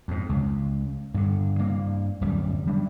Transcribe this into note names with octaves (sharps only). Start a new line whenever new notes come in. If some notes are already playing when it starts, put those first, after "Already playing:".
F2 G#2
C#2
G2 D3
G2 A#3
D1 F#2 G3
F#3 G3 D4